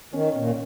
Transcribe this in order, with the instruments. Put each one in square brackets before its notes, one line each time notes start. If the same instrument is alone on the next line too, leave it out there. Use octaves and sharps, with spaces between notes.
[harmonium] D#3 [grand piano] C#4
[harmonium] A#2 [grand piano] C#4